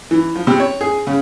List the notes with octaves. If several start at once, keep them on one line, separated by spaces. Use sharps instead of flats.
E3
F3
C3
C#5
G#4
C#3